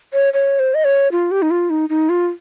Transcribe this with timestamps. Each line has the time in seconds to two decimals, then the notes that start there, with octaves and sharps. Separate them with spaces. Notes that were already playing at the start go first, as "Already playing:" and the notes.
0.13 C#5
0.34 C#5
0.59 C5
0.75 D#5
0.85 C#5
1.12 F4
1.31 G4
1.42 D#4
1.51 F4
1.70 D#4
1.90 D#4
2.09 F4